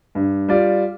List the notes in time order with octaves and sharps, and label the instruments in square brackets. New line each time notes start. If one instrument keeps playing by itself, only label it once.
[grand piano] G2
G3 F4 D5